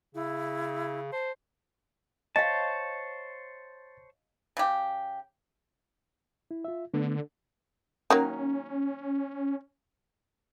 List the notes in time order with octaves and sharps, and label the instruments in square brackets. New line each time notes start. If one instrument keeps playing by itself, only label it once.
[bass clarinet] C#3 [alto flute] E4
[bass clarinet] C5 [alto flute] A5
[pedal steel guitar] C5 C#5 A5 [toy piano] D#5 F5 [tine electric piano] A6
[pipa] C#3 G4
[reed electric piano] E4
F4 E5
[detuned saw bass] D3 [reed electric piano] A3 B3
[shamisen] D#3 F#3 A#3 [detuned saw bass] C#4